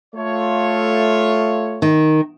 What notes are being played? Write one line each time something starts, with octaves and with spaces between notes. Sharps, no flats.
A3 F4 C#5
D#3